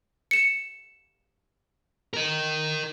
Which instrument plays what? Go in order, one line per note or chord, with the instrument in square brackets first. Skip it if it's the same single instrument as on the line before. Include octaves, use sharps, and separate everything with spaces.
[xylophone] C#7 E7
[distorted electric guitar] A#4 D#5